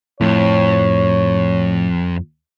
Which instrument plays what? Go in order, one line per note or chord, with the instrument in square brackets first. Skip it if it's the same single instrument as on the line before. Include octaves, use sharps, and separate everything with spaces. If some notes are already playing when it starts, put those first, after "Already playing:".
[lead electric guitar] F2 [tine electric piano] A2 [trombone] C#5